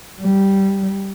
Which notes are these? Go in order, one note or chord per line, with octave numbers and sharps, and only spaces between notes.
G3